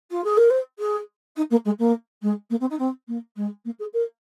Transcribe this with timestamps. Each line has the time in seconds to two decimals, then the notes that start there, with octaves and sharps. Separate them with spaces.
0.11 F4
0.24 G#4
0.37 A#4
0.50 C5
0.79 G#4
1.36 D#4
1.50 A#3
1.65 G#3
1.79 A#3
2.22 G#3
2.50 A#3
2.60 C4
2.70 D#4
2.79 C4
3.07 A#3
3.36 G#3
3.65 A#3
3.79 G#4
3.93 A#4